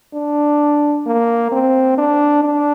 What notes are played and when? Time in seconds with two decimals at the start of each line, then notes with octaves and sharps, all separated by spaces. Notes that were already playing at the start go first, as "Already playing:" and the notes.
0.14 D4
1.06 A#3
1.52 C4
1.98 D4
2.44 D4